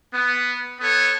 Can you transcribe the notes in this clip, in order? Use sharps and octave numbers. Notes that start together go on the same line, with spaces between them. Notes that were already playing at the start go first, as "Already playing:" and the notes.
B3
B3 A4 C#5